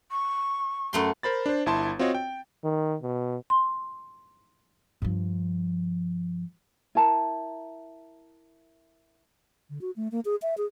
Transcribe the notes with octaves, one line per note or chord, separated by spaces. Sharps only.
C#6
F#2 A3 C6
A#4 C5 B5 A6
D4 C5
G1 E4 A5 C6
C4 F4 F#4 C#5 D#5
G5
D#3
B2
C6
G2 F3
E4 A#4 A5 A#5
D3
F#4
A3
A#3
G#4
E5
G#4